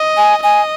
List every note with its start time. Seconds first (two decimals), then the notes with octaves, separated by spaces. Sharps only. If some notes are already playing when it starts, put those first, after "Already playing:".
Already playing: D#5
0.17 G#5
0.43 D#5 G#5